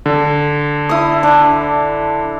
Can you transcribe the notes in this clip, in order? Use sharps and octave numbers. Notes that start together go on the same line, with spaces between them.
D3
E4 D#6
D4 E4